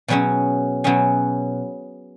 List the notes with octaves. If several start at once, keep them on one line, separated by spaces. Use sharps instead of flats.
B2 F#3 C#4 G#4
B2 F#3 C#4 G#4